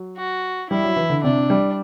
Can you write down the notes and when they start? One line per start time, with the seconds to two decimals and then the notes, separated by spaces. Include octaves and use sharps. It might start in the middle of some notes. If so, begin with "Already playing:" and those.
Already playing: F#3
0.17 F#4
0.70 G3 E4
0.84 F#3
0.96 E3
1.10 D3
1.23 C3 D4
1.50 G3